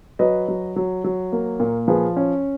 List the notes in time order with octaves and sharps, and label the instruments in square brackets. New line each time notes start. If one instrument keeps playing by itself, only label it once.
[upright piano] F#3 B4 D#5
F#3
F#3
F#3
A#3
A#2
F3 G#4 B4
C#4